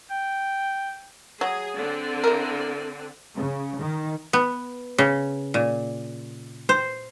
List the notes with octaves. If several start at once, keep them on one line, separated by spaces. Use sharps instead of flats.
G5
F#3 G#4
D3 C4
E4 A#4
C#3
D#3
B3
C#3
A#2
C5